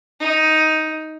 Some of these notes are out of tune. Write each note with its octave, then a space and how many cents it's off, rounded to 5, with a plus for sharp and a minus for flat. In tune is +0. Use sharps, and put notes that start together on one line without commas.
D#4 +10